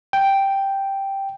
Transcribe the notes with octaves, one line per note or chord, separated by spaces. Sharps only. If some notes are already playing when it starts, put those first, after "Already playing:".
G5